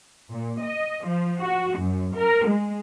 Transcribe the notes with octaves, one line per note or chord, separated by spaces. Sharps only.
A#2
D#5
F3
F#4
F#2
A#4
G#3